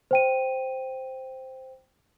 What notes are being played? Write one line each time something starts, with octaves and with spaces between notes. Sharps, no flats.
C5 G5 D#7